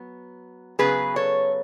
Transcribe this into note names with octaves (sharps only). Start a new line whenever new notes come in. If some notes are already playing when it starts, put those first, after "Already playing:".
Already playing: F#3 B3
C#3 F#3 B3 G#4 B4
A4 C#5